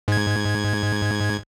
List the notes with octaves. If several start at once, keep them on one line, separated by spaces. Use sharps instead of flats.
G#2 G#6